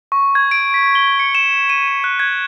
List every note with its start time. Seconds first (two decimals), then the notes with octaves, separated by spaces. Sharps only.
0.12 C#6
0.35 G#6
0.51 D7
0.74 B6
0.95 G7
1.19 C#7
1.35 E7
1.69 D#7
1.88 D#7
2.04 F#6
2.20 G#6